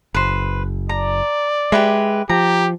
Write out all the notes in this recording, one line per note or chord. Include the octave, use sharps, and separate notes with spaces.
F#1 B4 C5
D5 A#5
G#3 G4 B4 E5
F3 G4 A#5